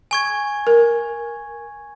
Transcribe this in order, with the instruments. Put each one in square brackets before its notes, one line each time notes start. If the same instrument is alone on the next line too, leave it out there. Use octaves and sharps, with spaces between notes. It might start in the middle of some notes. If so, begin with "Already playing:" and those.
[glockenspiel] G#5 C#6 G#6
[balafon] A#4